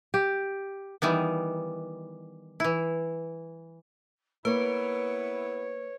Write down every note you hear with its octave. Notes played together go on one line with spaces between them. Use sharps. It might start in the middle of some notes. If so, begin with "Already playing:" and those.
G4
D#3 E3 G3 B3
E3 E4
A#3 B3 E4 B4 C#5